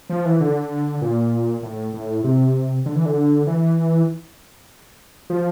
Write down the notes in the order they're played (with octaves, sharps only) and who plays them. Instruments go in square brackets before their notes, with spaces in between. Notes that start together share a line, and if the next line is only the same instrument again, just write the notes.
[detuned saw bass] F3
E3
D3
A#2
A2
A2
C3
D3
E3
D3
E3
F3